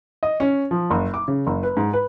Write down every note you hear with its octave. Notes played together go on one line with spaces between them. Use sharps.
D#5
C#4
F3
F#1
D6
C#3
F#1
B4
G#2
B4